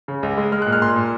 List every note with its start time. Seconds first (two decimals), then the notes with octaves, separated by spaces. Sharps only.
0.08 C#3
0.23 C#2
0.37 G#3
0.52 G#3 F6
0.62 F#6
0.66 A#2
0.73 F6
0.82 A#2 C6
0.96 A#2